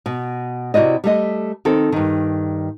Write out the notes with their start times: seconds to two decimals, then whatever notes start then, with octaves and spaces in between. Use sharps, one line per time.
0.06 B2
0.74 C3 E4 F#4 D5 D#5
1.04 G3 A3 D#5
1.65 D#3 C4 A4
1.92 G2 D#3